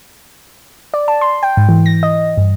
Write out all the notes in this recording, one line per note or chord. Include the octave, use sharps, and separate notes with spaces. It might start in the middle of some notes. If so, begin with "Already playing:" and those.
D5
A5
C6
G5
G#2
E3
A#6
D#5
G2